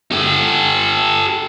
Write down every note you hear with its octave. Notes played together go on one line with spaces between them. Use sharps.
G4 A4